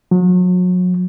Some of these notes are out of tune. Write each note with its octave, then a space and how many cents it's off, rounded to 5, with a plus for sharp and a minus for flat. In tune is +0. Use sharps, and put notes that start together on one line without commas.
F#3 -35